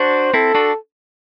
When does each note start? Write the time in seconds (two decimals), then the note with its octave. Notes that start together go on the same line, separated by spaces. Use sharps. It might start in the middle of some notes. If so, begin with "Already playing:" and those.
Already playing: D4 F#4 C5
0.34 C4 E4 A4
0.54 D4 F#4